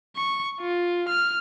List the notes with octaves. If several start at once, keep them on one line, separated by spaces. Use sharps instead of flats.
C#6
F4
F6